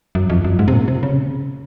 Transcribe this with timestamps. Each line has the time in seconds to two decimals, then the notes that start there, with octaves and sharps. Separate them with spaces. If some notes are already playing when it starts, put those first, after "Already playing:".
0.15 F#2
0.30 F2
0.44 F#2
0.59 G#2
0.68 C3
0.73 A#2
0.88 C3
1.03 C#3